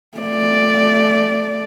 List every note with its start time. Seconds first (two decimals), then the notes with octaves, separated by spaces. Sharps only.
0.18 A3 D5